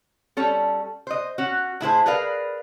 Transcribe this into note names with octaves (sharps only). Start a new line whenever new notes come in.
G3 C#4 A4
C5 D#5
C#4 F#4
A2 E4 G#4 C5
G#4 A#4 B4 D5 F5